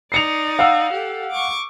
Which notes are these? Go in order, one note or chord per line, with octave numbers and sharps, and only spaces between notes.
D#4 D5 C7 C#7 F7
F5 F#5 E6
G4 A4
C#6 D6